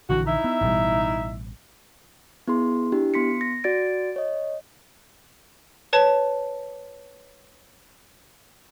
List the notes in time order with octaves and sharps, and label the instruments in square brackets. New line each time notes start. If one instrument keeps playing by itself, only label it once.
[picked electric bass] A#1 D3 E3 [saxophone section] F#4
[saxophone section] D#4 E4 E5
[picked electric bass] B3
A1 B2 G3
[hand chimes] B3 E4 G#4 C6
D4 E4 G4
B3 C6 B6 C#7
A#6
F#4 D5 A6 D7
C#5 D#5
[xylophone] B4 C#5 A5